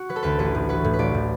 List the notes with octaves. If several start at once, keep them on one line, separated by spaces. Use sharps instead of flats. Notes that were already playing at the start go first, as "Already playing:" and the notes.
Already playing: F#4
F#3 B4
A4
D2 B4
A1 B4
A2
F#3 B4
A2
B4
A1 D5
A2